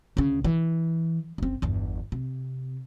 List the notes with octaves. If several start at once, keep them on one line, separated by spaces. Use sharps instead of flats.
D2 C#3
E3
F#1 C4
G1 E2
C3